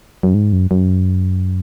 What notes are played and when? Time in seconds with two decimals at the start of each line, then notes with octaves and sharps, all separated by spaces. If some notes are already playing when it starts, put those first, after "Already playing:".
0.23 F#2
0.34 G#2
0.53 F#2
0.71 F#2